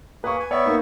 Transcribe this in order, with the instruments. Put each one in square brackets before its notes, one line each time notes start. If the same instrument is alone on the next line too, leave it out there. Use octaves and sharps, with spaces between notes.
[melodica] A#3 G#4 [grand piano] B4 C#6
[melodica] G#5
[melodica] B3 E5 C#6 [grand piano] C#5 D5
[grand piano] A#3 D#4